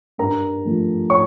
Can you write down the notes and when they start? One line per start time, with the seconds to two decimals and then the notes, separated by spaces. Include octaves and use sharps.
0.18 G2 A#4 A#5
0.65 F3 A3
1.10 C#5 C#6